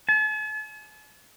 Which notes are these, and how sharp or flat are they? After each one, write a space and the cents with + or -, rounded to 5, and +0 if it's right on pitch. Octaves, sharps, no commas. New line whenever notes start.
A5 -45